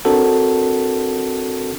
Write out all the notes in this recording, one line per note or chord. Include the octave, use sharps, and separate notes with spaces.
C4 D4 F#4 A4 A#4